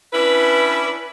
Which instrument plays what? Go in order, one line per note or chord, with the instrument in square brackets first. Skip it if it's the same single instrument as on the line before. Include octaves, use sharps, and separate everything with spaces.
[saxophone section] C#4 D4 E4 B4